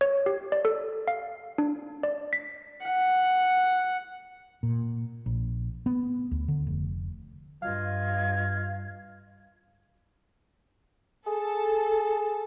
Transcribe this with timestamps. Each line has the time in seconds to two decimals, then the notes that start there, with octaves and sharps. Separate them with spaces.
0.01 C#5
0.26 G4
0.52 D5
0.65 A4
1.08 F5
1.58 D4
2.03 D5
2.33 B6
2.86 F#5
4.63 A#2
5.26 A#1
5.86 B3
6.31 D2
6.48 D3
6.67 F1
7.62 G2 F4 D#5 F5 G#6
11.27 G#4 A4